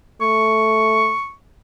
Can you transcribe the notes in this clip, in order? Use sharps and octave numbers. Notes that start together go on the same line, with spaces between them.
A3 C#6